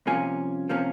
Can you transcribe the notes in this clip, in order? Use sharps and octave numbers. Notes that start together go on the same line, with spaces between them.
C2 C3 F3 A#3 C#4 G#5
C3 F3 A#3 C#4